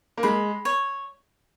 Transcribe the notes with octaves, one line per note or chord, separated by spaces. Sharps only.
A#3
G#3 B5
C#5